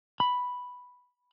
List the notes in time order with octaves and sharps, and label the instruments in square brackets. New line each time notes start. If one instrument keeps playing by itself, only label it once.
[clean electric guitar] B5